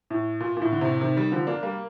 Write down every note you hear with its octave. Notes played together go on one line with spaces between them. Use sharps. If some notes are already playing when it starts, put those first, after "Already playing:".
A2
A#2
A#2
A2
D3
A2 C3
C3 D#3
D#3 G3
D3 F3
A#3 D4
G3 A#3